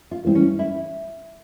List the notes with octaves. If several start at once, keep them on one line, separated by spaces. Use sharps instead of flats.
F4
E3 G3 C4
C#4
E4